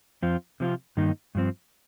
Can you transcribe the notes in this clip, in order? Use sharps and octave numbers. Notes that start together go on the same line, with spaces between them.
F2 F3 C4 F4
C3 F3 C4 F4
G2 D#3 A#3 D#4
G2 F3 C4